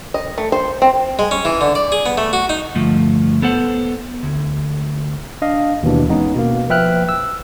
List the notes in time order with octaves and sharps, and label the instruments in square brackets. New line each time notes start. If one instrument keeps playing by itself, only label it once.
[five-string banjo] D#5
A3
C5
C4
[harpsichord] G#3
C#4
E3
D3
D5
G#4
B3
A3
F#4
D#4
[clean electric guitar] D2 G2 F3 A3
B3 A4 C5 F#5
D2
[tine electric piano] D4 D#5 F5
D#2 B2 E3 D4
G#3 B3 C#4 D#4
B2 A#3
F3 B4 E5 G5 F6 F#6
E6